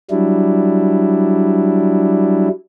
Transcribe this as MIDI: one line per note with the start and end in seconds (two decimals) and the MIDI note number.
0.10 2.49 54
0.10 2.49 55
0.10 2.49 62
0.10 2.49 64